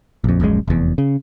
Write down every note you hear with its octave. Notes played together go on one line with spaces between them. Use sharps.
A#1 F2
D#1 A#1 F#2 G#3
F1 E2
C#3